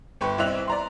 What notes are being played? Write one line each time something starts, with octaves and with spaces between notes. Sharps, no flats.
G1 B4 G5 C#6
C2 C4 D#5 E5 F#6 F7
D5 A#5 C6